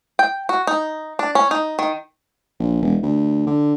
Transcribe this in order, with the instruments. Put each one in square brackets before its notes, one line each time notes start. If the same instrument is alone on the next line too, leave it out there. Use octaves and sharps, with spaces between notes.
[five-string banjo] G5
F#4
D#4
D4
C#4
D#4
D#3
[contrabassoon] A#1
E1
D2
D3